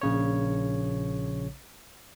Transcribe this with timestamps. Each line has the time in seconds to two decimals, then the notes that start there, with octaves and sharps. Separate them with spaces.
0.01 A#1 C#3 C#5